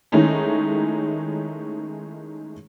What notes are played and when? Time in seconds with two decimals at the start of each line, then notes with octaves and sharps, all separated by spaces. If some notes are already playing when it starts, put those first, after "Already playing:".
0.12 D#3 G#3 A3 C#4 D#4 E4